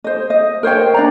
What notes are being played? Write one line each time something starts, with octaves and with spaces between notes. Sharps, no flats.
C5 D#5
D#5
A#4 C5 C#5 G5
D4 D5 A#5